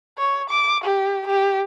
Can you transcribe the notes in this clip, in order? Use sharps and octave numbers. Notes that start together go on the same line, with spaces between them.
C#5
D6
G4
G4